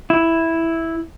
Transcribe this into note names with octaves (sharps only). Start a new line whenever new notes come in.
E4